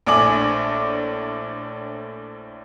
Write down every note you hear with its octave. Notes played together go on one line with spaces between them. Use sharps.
A#1 A2 D4 G#5 D6 F#7